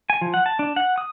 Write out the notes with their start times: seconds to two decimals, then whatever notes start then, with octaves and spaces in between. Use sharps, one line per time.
0.10 G#5
0.21 F3
0.34 F#5
0.46 A5
0.59 D4
0.76 F#5
0.98 D#6